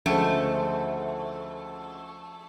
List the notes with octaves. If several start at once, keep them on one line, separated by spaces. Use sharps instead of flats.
D2 C#3 F3 G#3 A3 C5